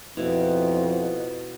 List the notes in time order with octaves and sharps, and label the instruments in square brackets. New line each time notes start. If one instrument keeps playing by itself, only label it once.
[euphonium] F2 [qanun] B2 E4